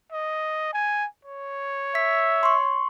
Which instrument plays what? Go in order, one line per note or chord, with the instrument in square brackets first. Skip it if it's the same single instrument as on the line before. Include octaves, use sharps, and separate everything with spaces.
[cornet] D#5
G#5
C#5
[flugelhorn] E5 [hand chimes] B6
[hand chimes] C6 C#6